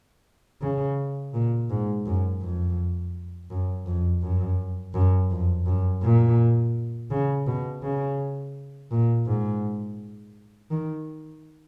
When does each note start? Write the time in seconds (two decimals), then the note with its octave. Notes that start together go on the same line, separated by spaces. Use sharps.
0.61 C#3
1.34 A#2
1.70 G#2
2.06 F#2
2.42 F2
3.50 F#2
3.86 F2
4.23 F#2
4.94 F#2
5.31 F2
5.66 F#2
6.03 A#2
7.11 C#3
7.47 B2
7.83 C#3
8.91 A#2
9.26 G#2
10.71 D#3